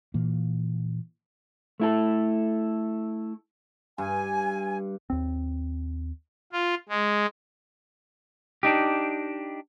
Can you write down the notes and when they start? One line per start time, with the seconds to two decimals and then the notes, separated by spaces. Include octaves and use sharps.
0.14 A#2 E3 A#3
1.80 A3 E4 A4
3.98 G2 G#5
5.10 D#2 C4
6.52 F4
6.89 G#3
8.63 D4 D#4 G4